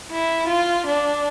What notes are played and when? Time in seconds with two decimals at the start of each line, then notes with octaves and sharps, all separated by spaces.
0.11 E4
0.48 F4
0.86 D4